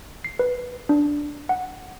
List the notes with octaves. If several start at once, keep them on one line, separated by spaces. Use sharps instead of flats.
C7
B4
D4
F#5